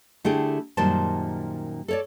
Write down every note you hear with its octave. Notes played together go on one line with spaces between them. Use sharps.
D3 A3 E4 G4 G#4 G5
F#2 A#2 D#3 G3 C5 A5
A4 C#5 D5